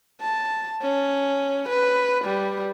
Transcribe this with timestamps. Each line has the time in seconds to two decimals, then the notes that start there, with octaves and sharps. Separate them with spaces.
0.21 A5
0.82 C#4
1.69 B4
2.24 G3